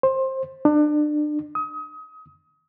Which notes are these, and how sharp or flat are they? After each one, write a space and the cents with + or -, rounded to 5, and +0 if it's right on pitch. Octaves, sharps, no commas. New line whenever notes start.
C5 +20
D4 +30
D#6 +30